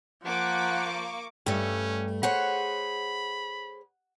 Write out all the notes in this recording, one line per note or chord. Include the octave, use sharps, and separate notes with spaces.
F3 A#3 F#5 C#6 D6
G2 A3 C#4 G4
G#4 C5 C#5 F#5 B5